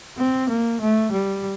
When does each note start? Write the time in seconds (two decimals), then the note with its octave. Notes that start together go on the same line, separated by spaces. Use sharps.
0.17 C4
0.49 A#3
0.81 A3
1.11 G3